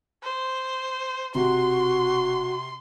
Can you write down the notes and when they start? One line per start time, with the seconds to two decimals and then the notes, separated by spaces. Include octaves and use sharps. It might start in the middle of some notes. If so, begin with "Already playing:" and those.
0.23 C5
1.35 E1 C3 F#4 C6